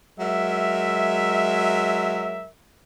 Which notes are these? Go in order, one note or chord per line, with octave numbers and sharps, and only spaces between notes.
F#3 G#3 A#4 E5